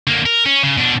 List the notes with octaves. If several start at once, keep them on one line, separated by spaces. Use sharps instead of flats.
D3 A#3
A#4
C#4
C#3
B2 D4